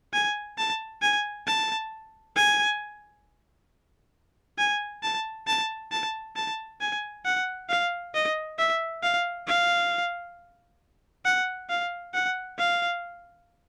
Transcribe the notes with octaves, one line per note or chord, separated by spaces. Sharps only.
G#5
A5
G#5
A5
G#5
G#5
A5
A5
A5
A5
G#5
F#5
F5
D#5
E5
F5
F5
F#5
F5
F#5
F5